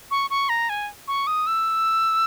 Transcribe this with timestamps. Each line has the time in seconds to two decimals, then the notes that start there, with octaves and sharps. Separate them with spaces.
0.11 C#6
0.30 C#6
0.49 A#5
0.69 G#5
1.08 C#6
1.27 D#6
1.47 E6